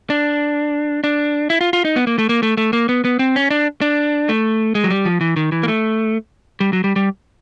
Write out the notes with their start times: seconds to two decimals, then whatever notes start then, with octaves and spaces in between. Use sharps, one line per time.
0.10 D4
1.04 D4
1.50 E4
1.61 F4
1.73 F4
1.85 D#4
1.96 B3
2.07 A#3
2.18 A3
2.29 A#3
2.43 A3
2.57 A3
2.73 A#3
2.89 B3
3.05 B3
3.19 C4
3.36 C#4
3.50 D4
3.81 D4
4.29 A3
4.75 G#3
4.84 F#3
4.90 G3
5.05 F3
5.21 E3
5.36 D#3
5.52 E3
5.63 A#3
5.68 A3
6.60 G3
6.73 F#3
6.84 G3
6.96 G3